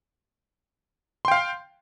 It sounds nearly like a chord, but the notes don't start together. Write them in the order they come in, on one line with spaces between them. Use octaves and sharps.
C6 G5 F5